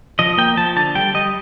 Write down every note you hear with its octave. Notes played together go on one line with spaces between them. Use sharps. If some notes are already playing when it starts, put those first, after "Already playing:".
F3 D#5
A#3 G5
F3 A5
D3 A5
G3 G5
G3 D#5